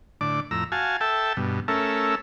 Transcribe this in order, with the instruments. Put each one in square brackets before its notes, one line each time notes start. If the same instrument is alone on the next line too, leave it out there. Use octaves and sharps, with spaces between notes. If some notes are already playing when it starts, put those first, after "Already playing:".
[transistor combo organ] A2 D3 D5 D6
F2 A2 A#5 E6
F#4 F5 G#5 A5
A4 E5 G5 A5
G2 B2
A3 C#4 A4 A#4 E5